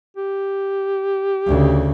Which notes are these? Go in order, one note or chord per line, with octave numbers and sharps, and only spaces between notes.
G4
D2 C#3